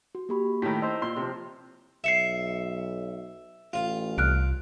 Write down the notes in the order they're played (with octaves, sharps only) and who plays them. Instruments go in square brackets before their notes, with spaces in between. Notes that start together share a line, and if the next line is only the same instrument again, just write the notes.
[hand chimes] F#4
A#3 G4 B5
[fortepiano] A2 D#3 [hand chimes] E4 B6
[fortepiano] D#4 C5 [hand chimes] E6
[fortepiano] A#2 C6
[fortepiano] C3 F3 [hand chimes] C6
[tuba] B1 [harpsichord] E5 [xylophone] C7 C#7 E7
[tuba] A1 [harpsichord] F4
[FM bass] C2 [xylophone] F6 F#6 D7